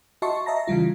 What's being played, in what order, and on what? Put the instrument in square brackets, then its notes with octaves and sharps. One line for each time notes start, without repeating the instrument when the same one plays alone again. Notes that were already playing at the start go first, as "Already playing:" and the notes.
[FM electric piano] F#4 D#5 E5 A5 C6 C#6
D#5 E5 A5 A#5 A#6
C#3 E3 G3 F4